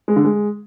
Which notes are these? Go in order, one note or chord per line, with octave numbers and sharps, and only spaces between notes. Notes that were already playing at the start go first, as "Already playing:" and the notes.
G#3
D3
G#3